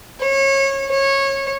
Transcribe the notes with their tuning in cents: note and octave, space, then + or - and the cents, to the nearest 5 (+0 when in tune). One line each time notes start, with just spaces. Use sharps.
C#5 -25
C#5 -20